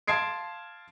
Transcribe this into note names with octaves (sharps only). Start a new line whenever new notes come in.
F5 A5 C6 G#6 C7 D7